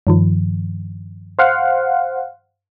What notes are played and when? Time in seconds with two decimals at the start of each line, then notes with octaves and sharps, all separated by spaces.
0.07 G2 D#3 F3
1.39 C5 F5 F#5